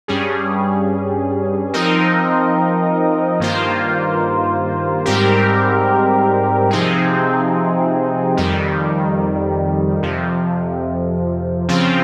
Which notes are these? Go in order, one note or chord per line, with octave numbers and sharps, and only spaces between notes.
G2 G3 C#4 G#4
F3 C4 D#4 A#4 D#5
G2 D#3 A#3 F4 C5
G#2 G3 C4 G4 A#4
C3 F3 C4 D#4 G#4
F2 D#3 G3
F2 C3 F3
C#3 F3 C4 F4